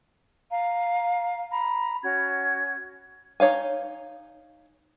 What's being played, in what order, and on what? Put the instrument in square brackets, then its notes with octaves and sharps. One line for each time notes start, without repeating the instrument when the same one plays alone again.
[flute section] F5 A#5
A#5 B5
C#4 F#4 G#6
[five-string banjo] D#4 F#4 C#5 F5 G#5